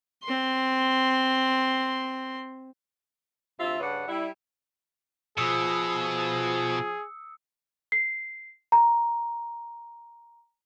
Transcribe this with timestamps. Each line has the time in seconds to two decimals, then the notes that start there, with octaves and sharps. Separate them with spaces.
0.24 C4 C6
3.60 D2 C3 F4 E5
3.80 G2 C#3 D4 B4 F#5
4.08 G3 E4
5.38 B2 F3 G#4 D#6 E6 C#7
7.92 C7
8.72 A#5